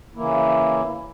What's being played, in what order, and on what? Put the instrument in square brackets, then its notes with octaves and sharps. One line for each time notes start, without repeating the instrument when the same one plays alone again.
[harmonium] C#3 E3 A#3 E4